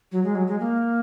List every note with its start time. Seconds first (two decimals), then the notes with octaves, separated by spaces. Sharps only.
0.12 F#3
0.24 G#3
0.35 F#3
0.47 G#3
0.60 A#3